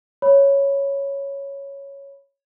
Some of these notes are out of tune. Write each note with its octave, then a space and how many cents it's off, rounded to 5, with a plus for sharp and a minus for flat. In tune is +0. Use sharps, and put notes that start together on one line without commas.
C#5 +0 B5 +0